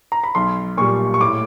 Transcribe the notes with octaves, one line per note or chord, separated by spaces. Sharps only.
A#5
B5
B1 C6
A#2 G3 C#6
C#6
A2 D6